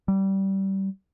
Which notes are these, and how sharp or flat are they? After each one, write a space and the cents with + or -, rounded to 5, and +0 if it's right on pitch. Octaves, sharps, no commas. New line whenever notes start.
G3 -20